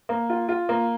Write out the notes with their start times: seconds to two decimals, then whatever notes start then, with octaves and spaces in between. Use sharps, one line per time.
0.09 A#3
0.30 F4
0.49 F4
0.69 A#3